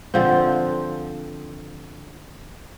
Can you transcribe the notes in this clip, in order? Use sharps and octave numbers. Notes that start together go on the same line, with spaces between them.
D3 F3 C4